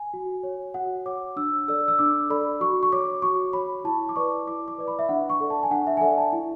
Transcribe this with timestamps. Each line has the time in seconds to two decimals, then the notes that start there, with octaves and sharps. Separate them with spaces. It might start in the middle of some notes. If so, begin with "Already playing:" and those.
Already playing: G#5
0.14 F#4
0.43 C#5
0.74 F#4 F#5
1.06 C#5 D6
1.36 D4 E6
1.68 A4 D5 E6
1.88 E6
1.99 D4 D6
2.30 A4 D5 B5
2.61 F#4 C#6
2.83 C#6
2.92 C#5 D6
3.22 F#4 C#6
3.53 C#5 B5
3.84 E4 A5
4.09 D6
4.16 B4 D5 C#6
4.47 E4 D6
4.68 D6
4.78 B4 D5
4.88 B5
4.99 E5
5.09 D4 F#5
5.30 C#6
5.40 A4 D5
5.50 A5
5.63 G#5
5.70 D4 F#5
5.87 E5
5.97 G#5
6.01 A4 D5 F#5
6.18 A5
6.33 E4